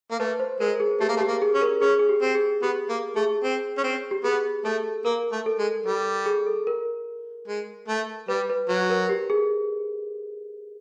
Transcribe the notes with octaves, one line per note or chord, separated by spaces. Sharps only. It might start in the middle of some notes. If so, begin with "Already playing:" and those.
A#3
A3 B4
C5
G#3 A#4
G#4
A3 G4
A#3
A3
G4
A#3
G#4
C#4
A#4
C#4 G#4
G#4
G4
C4
G#4
B3 G4
A#3
A3 G#4
C4
C#4
C4
G4
B3 G#4
A3 A4
A#3 A#4
A3
A4
G#3
G3 A4
G#4
A4
A#4
G#3
A3
G3 B4
B4
F#3 B4
A#4
G4
G#4